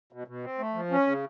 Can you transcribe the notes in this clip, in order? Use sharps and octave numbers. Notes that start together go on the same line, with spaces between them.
B2
B2
C4
A3
F3
C#4
C#3